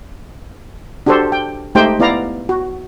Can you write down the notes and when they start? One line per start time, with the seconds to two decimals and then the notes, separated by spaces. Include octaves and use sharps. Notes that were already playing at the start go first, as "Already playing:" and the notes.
1.06 D4 F#4 G4 A4 C5
1.32 G5
1.75 G#3 A3 D#4 G4 C5 G5
2.00 B3 E4 D5 F5 A#5
2.49 F#4